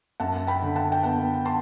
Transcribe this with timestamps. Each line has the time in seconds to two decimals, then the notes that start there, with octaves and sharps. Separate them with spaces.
0.20 F#2 F#5 A5
0.47 G5 B5
0.62 D3
0.76 F#5 A5
0.92 G5
1.03 B3 F#5 A5
1.45 A5 C6